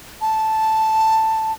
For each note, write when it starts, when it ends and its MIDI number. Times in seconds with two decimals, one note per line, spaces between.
0.21 1.53 81